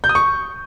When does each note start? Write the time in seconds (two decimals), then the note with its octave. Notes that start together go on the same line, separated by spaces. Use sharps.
0.04 G6
0.09 D#6
0.15 C#6